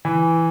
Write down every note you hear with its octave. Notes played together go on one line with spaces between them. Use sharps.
E3